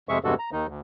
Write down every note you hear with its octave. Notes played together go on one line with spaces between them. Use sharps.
F2 C3 G#3 G#4 E5 C#6
E2 G2 C3 G#3 F#4 A4
A#5
D#2 D#3 D#4
D2